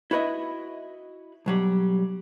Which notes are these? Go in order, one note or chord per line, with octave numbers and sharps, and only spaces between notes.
E4 F#4 B4 D#5 E5
B1 F#3 G3